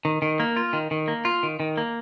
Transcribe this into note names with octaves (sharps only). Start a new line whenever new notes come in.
D#3
D#3
A#3
F4
D#3
D#3
A#3
F4
D#3
D#3
A#3